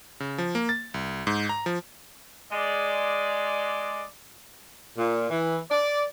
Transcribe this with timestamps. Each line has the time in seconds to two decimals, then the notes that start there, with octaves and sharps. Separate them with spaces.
0.20 C#3
0.38 F3
0.55 A#3
0.69 A6
0.94 C2
1.27 G#2
1.49 A#5
1.66 F3
2.51 G#3 D5
4.98 A#2
5.30 E3
5.70 D5